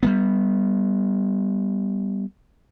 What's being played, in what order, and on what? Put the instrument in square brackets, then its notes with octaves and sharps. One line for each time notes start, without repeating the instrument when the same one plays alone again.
[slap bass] G3 G#3 B3